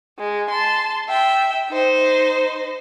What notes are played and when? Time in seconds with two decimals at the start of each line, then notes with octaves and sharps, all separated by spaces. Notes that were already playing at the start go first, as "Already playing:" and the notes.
0.19 G#3
0.50 A5 C6
1.09 E5 G5
1.71 D#4 C5